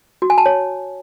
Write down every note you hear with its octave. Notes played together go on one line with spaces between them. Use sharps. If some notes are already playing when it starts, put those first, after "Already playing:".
F#4
G#5
A5
C#5